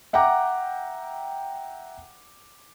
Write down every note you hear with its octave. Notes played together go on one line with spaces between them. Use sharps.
E5 F#5 G5 A#5 D6